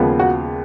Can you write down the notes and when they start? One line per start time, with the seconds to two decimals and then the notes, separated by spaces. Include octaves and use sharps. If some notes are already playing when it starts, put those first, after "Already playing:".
Already playing: D#2 C#3 F3 G#3 B3
0.20 F#4